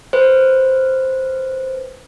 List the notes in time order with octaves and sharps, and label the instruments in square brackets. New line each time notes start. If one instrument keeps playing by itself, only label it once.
[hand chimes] B4 C5